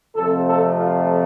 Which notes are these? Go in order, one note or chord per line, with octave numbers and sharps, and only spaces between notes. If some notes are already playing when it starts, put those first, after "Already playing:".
F2 C3 F3 A3 C4 A4
A4
F4